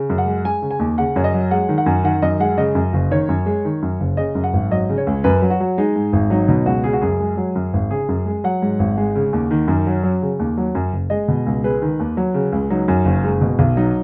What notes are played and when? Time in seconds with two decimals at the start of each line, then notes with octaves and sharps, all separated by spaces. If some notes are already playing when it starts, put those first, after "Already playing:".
Already playing: C#3
0.10 F#2
0.18 F#5
0.26 G#3
0.45 G#3 G#5
0.62 C#3
0.71 G#5
0.79 D#2
0.98 C#3 F#5
1.16 F#2 C#5
1.24 D#5
1.34 F#3
1.51 G#3 F#5
1.69 D#3
1.78 F#5
1.86 F#2
2.04 D#3 F#5
2.22 F#2 D#5
2.40 G#3 F#5
2.58 C#3 D#5
2.75 F#2
2.93 F#1
3.11 D#3 C#5
3.29 F#2
3.46 G#3
3.65 D#3
3.82 F#2
4.00 F#1
4.17 C#3 D#5
4.35 F#2
4.44 F#5
4.53 G#1
4.71 F#3 D#5
4.89 C#3
4.98 C#5
5.07 C#2
5.24 F#2 B4
5.42 F#3
5.50 F#4
5.60 F#3
5.78 G#3 D#4
5.96 G#2
6.13 G#1
6.30 F#3 D#4
6.48 B2 D#4
6.66 C#2 F#4
6.84 C#3 G#4
6.93 F#4
7.01 F#2 G#4
7.20 G#3
7.37 F#3
7.56 F#2
7.73 G#1
7.90 C#3 G#4
8.09 F#2
8.26 G#3
8.44 F#3 F#5
8.62 G#2
8.79 G#1
8.97 G#3
9.16 C#3
9.33 D#2
9.51 D#3
9.68 F#2
9.87 F#3
10.03 F#3
10.22 C#3
10.39 D#2
10.57 F#3
10.75 F#2
10.93 F#1
11.10 G#3 D#5
11.28 B2
11.46 C#2
11.64 G#3 B4
11.82 D#3
12.00 D#2
12.17 F#3
12.34 C#3
12.52 C#2
12.70 F#3 D#4
12.88 F#2
13.05 F#1
13.24 G#3
13.41 B2
13.59 B1
13.77 F#3 D#4